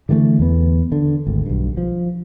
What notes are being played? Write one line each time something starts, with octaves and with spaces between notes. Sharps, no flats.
D3 E3 G3 A3
E2 B3
D3
G#1 D2
B1 G2
F3